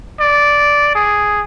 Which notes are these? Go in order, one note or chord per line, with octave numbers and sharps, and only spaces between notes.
D5
G#4